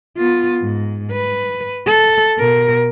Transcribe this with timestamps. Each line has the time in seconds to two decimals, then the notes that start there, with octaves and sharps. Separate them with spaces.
0.17 B3 F4
0.61 G#2
1.12 B4
1.87 A4
2.38 B2 A#4